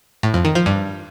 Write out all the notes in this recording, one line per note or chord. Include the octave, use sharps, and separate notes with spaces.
A2
F2
D#3
F3
G2